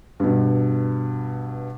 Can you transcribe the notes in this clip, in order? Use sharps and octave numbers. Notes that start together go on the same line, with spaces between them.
G2 B2